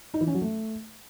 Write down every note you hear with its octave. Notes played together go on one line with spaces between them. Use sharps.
D#4
E3
C#4
F#3
A3